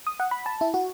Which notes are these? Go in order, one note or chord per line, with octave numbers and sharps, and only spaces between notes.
D#6
F#5
B5
A5
E4
F#4